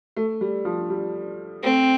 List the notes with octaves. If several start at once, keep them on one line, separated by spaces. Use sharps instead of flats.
A3
G3
F3
G3
A3 C4